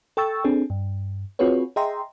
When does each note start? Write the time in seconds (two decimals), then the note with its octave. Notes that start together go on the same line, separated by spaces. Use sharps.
0.17 A4 G5 C#6 E6 A6
0.44 C4 D4 G#4 A4
0.70 G2
1.39 C4 F4 F#4 G#4 B4 C#5
1.76 G#4 D#5 E5 G5 A#5 C6